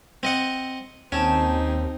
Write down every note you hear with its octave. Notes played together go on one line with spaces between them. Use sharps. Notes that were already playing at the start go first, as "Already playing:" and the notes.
C4 D#5 F#5
D#2 C4 C#4 D#4 G5 A5 E6